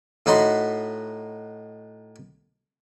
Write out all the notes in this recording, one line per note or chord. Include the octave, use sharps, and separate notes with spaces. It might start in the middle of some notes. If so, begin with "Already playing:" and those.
A2 D#4 F#4 B5 C6